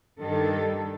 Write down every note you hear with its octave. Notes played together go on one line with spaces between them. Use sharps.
G2 D#3 G3 D4 A4